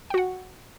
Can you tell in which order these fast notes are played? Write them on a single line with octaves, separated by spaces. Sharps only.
G5 F#4 F#5